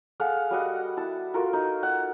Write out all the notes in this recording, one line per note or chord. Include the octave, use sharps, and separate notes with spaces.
G#4 A4 F5 F#5
G3 F#4 D#5 F#5
E4 A5
F4 F#4 A4 A#4
D#4
F#5